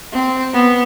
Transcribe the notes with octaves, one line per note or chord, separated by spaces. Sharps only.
C4
B3